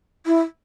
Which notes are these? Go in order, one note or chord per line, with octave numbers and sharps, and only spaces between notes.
E4